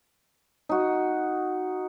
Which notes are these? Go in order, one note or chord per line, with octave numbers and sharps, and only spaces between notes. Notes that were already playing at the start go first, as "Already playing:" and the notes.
D#4 F#4